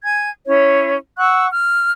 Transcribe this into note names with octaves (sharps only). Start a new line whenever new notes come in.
G#5 G#6
C#4 E4 C#5
F#5 C#6 E6 F#6
F6